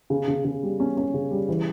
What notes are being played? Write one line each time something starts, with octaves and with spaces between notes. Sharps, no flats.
C#3
C#3
C#3
G3
C#4
C#4
C#3
G3
E3